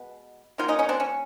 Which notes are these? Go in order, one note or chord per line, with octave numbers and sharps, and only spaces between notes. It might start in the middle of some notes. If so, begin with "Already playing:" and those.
Already playing: B2 G#3 B3
D#3 F#3 A#3 D#4 F4
C#4 D#4
C#4 D#4
C4 D4
C#4